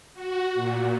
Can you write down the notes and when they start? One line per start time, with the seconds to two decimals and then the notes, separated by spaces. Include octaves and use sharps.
0.14 F#4
0.54 A#2